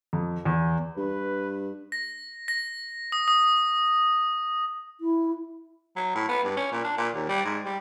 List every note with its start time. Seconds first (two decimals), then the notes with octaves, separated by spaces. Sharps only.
0.13 F2
0.45 E2
0.97 G2 B4
1.92 A#6
2.48 A#6
3.12 D#6
3.28 D#6
5.00 E4
5.96 F#3
6.15 A2
6.29 B3
6.44 G2
6.57 C#4
6.72 A#2
6.84 D4
6.98 A#2
7.15 D#2
7.29 G3
7.45 G#2
7.65 G3